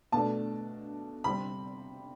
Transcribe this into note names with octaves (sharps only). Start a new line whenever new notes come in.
B2 A3 D4 A5
C3 G3 C4 B5